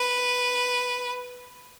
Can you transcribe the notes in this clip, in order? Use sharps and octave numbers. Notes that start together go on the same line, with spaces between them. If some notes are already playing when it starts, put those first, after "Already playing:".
Already playing: B4